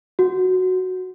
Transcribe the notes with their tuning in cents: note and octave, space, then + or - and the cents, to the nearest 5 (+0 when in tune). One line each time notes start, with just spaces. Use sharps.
F#4 +0